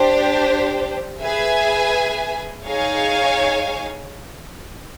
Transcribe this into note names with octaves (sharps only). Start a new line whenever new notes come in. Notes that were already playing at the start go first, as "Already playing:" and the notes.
Already playing: D4 G4 C5
G#4 B4 E5 G#5
D#4 G#4 C#5 F5 G#5